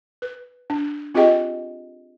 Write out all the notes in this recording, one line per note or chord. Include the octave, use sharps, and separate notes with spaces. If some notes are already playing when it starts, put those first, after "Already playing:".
B4
D4
C4 F4 G4 G#4 D#5 G5